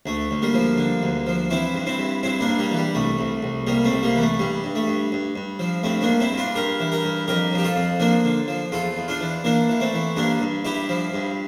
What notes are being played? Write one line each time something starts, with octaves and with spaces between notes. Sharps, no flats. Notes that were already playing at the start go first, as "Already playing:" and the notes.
D2 A3
D2
G3 A#3
F3
D3
D2
F3
E3 C4 E4
G2
C4 E4
G2
G2 C4 E4
A#3 D4
G2
G3 A#3
E3
G3
C2 A3
C2
C2
C2 G3 A#3
A3 C4
C2
G3 A#3
E3
A3
G2 G3
G2
A3
G2
G2
G2
F3
G2 A3 C4
A#3 D4
G2
C4 E4
G2
D4 F4
G2 G4 A#4
E3
G4 A#4
G2
F2 G4 A#4
F3
G4
F4 A4
F2
F3 A#3 D4
D3
F3
E2 F4 A4
E2
D4 F4
E3
E3 A#3 D4
E3
A3 C4
E3
G2 A#3 D4
G2
G2 E4 G4
F3
G2